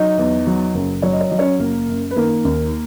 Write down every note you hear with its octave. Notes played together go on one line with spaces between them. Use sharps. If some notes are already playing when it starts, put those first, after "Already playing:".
Already playing: F#3 D#4 D#5
E2
F#3
F#1
F#3 C#5
D#5
C#5
F#3 D#5
C#4 C#5
F#1 A#3 A#4
F#2
B4
D#3 A#3 A#4
D#2